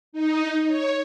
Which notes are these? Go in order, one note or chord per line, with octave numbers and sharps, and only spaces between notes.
D#4
C#5